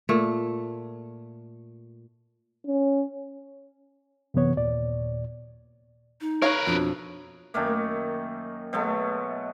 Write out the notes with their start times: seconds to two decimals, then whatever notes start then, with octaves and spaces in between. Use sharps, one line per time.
0.09 A#2 A3
2.66 C#4
4.34 F#2 C3 E3 B3 C#5
4.56 D#2 A#2 D5
6.21 D#4
6.42 A#4 B4 C#5 F5
6.67 F2 B2 D4
7.54 F#2 D#3 A3 A#3
8.73 B2 F#3 G#3 A3